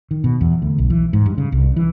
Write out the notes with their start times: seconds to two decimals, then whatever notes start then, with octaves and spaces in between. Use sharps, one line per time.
0.11 D#3
0.24 B2
0.41 E2
0.62 D2
0.78 B1
0.90 E3
1.13 G#2
1.26 G2
1.38 C#3
1.52 C2
1.76 E3